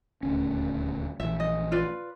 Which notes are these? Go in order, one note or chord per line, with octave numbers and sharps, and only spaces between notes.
D#1 D2 C#4
A#1 E3 E5
D#5
F4 B4 D5